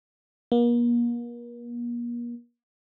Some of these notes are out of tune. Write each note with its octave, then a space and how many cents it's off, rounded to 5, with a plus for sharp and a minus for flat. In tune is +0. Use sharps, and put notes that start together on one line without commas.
A#3 +40